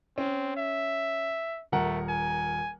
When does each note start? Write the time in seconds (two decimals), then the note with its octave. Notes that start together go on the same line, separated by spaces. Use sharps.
0.18 C4 C#4
0.56 E5
1.72 D#1 A3 A#4 F#5
2.09 G#5